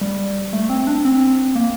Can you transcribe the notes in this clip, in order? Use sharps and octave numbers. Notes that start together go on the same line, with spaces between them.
G3
A3
C4
D4
C4
A#3